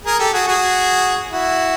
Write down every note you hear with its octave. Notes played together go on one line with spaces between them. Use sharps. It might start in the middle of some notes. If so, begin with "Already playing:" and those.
G#4 A#4
G4 A4
F#4 G#4
F#4 G#4
E4 F#4